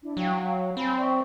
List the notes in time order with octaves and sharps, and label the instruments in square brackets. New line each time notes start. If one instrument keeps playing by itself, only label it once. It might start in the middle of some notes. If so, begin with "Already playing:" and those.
[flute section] D4 E4
[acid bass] F#3 [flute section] F5 G5
[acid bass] C4 [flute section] F5 G#5 B5
[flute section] D5 E5 C#6